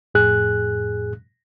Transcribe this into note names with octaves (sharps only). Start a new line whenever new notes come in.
F2 A2 G#4 F#6